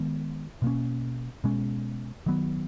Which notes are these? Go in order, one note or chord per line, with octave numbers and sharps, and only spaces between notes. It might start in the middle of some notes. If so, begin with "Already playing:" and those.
Already playing: D#3 G#3 B3
B2 A#3 C#4
B2 G#3 C#4
D#3 F#3 B3